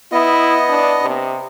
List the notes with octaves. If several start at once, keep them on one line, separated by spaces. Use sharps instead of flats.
B3 E4 D#5
D4
C3